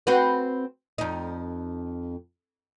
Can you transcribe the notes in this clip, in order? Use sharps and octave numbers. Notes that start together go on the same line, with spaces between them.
C4 F#4 B4
F2 D#4